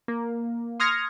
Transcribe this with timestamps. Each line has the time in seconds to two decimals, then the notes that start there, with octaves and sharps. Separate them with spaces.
0.08 A#3
0.80 C6 D#6 F6 G#6 A#6 C#7